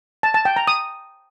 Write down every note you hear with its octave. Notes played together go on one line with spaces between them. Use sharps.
A5
A5
G5
A#5
D#6